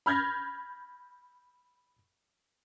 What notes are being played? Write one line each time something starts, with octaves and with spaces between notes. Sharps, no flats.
B5 F6 G6 G#6 A#6